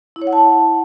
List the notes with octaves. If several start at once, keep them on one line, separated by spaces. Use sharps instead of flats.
E4
C#5
F#5
A5